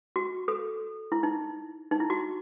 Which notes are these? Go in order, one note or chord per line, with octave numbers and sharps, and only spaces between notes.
F#4
A4
E4
D#4
D#4
E4
F#4